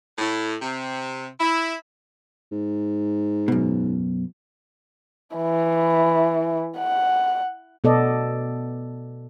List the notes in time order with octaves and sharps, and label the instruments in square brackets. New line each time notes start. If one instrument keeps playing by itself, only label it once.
[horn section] A2
C3
E4
[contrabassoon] G#2
[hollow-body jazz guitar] F#2 B2
[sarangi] E3
F#5
[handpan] B2 B3 A4 D5 D#5